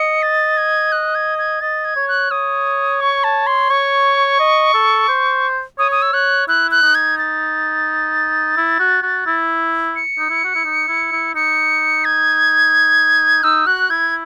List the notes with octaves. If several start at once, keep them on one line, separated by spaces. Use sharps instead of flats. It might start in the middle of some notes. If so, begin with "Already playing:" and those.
Already playing: D#5 C#7
A6
G#6
F#6
G#6
G#6
D#5 A6
G#6
C#5
F#6
C#5 D#6
C#6
A5
C6
C#5 C#6
D#5
A4
C5
C#5 D#6
D#6
E6
C#5 F#6
E4 F#6
F#6
D#4
G#6
A6
E4
F#4
F#4
E4
C#7
D#4
E4
F#4
E4
D#4
E4
E4
D#4 C#7
G#6
D#4 E6
F#4 F#6
E4 G#6